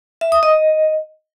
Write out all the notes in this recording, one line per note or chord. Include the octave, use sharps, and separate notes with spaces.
E5
D#6
D#5